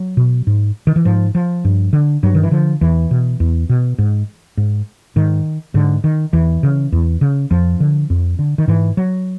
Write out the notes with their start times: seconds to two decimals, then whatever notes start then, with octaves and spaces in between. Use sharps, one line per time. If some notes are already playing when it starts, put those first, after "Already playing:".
Already playing: F#3
0.17 B2
0.47 G#2
0.87 D#3
0.96 E3
1.05 G#2 F3
1.35 F3
1.65 G2
1.93 D3
2.23 G2 F#3
2.35 D#3
2.43 E3
2.51 D3 F3
2.81 E2 E3
3.11 B2
3.40 E2
3.69 B2
3.98 G#2
4.57 G#2
5.16 G#2 D#3
5.74 G#2 D3
6.04 D#3
6.33 E2 E3
6.63 C#3
6.92 E2
7.21 C#3
7.51 F2 F3
7.80 D3
8.10 F2
8.39 D3
8.58 D#3
8.68 G#2 E3
8.97 F#3